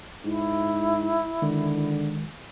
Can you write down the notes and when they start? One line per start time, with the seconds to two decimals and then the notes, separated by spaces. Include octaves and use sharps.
0.24 G#2 E4
1.42 D3 D#3 G#3